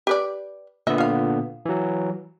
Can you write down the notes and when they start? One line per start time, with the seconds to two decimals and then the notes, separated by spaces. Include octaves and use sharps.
0.07 G4 B4 D5
0.87 A#2 D3 B3 D#5 E5
0.98 F4 F5
1.66 E3 F#3